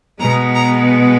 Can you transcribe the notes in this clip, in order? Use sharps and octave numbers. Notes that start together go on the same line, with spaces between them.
B2 G#3 B3 A#5
A#5